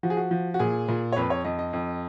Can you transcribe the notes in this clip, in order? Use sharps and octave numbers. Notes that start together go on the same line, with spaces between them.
F3 F#4
G#4
F#4
F3
F#4
A#2 G#4
A#2
C#5
F2 B4
C#5
F2 D#5
D#5
F2